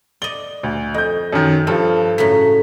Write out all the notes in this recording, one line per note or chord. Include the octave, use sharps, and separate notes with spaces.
D5 D#5 G7
D2
F2 D#5 G6
F#2 D#3
G2 F3 A4
A2 C#3 F#3 B6